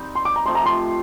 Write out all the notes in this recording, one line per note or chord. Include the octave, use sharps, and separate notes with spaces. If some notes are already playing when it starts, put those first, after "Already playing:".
Already playing: G3 C4 D#4
C6
D6
A#5
C3 F3 A3 C6
A#5
C6